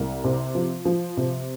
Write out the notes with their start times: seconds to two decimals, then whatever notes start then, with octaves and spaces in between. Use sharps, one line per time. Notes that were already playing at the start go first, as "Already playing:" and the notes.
Already playing: C2
0.24 C3
0.55 F3
0.85 F3
1.17 C3